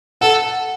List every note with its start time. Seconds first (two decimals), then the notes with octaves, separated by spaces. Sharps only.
0.21 A4 F#5